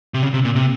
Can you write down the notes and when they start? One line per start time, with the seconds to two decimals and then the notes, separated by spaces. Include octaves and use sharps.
0.14 C3
0.23 C#3
0.34 C3
0.45 A#2
0.55 C3